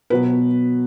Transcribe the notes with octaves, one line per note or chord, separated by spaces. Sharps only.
B2 F#3 B3 B4